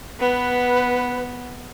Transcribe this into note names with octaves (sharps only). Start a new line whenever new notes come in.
B3 B4